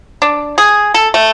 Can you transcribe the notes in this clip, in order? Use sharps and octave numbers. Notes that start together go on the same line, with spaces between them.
D4
G#4
A4
A3